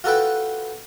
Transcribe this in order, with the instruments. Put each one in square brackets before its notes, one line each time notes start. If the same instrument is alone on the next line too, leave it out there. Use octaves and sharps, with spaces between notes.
[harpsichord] F4 F#4 A4 B4 G5